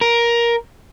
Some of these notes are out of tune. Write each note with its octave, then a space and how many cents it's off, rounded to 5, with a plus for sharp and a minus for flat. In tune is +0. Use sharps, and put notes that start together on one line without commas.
A#4 +10